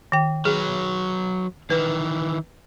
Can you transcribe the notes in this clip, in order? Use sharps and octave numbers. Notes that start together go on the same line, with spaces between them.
D#3 G5
F#3 G#4 B4
D#3 E3 B4